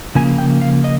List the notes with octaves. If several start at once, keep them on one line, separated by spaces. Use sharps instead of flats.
C#3 F3 A#3 G#5
G5
F5
D#5